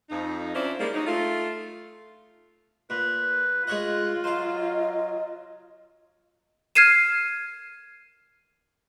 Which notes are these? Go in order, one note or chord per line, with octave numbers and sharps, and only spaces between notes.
F2 D#4
C#4 D4 E4 F4 C5
G3 G#3 A#3
F#3 D#4
A3 F4
A#2 B4
G#3 F4 C#5 D#5 F#6
F#3 C5 D#5 F5
F6 G#6 C7 D#7 E7